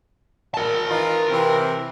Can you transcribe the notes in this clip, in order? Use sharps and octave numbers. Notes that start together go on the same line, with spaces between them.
A#4 A5
E3 D#4 F4
C3 E3 C4